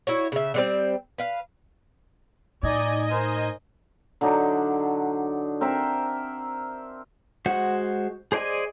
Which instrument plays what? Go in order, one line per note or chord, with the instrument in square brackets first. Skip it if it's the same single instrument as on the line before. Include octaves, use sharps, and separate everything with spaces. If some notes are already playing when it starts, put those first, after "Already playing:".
[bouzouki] E4 F#4 C#5
C#3 E5
D3 G3 C4
B4 F5
[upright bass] A2 [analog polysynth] D#4 D#5 G#5 [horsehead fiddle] D5
[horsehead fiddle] A#4 C5
[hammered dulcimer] D3 F#3 D4 D#4
C4 A#4 C5 E5
[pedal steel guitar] G#3 F#4 C5 F#5
G#4 C5 D5 D#5 G#5